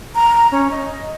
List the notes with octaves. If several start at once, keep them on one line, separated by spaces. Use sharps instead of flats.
A#5
C#4
D#5